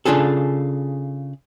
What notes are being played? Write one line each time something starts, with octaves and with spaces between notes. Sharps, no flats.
C#3 D4 F4 G#4 A4